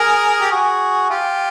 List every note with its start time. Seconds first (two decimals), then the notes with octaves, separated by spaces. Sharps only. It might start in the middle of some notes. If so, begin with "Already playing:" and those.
Already playing: G#4 A#4
0.41 G4
0.51 F#4 G#4
1.10 F4 G4